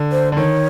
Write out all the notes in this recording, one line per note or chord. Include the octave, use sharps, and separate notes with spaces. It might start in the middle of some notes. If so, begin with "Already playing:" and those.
Already playing: D3
C5
D3
D#3 C#5